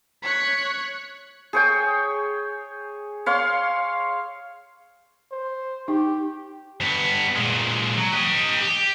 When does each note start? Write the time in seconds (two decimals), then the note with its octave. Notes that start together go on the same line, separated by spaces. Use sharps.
0.23 C#5 F#6 B6
1.53 G#4 C#5 G5
3.26 C#5 F5 C6
5.32 C5
5.88 D#4 G4
6.81 G2 B3
7.36 A#2 G#3
7.97 F#3
8.12 G4 D#5
8.61 G4